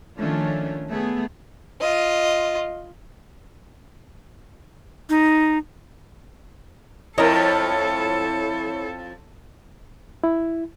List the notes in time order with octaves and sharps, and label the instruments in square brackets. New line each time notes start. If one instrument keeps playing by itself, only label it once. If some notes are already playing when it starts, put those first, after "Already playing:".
[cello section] D#3 F3 A3 C#4 D4 F4
A3 B3 G#4
[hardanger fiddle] F4 D#5
[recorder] D#4
[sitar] F2 F3 [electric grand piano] E4 C#5 [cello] A4 [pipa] A#4 D#5
[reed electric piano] E4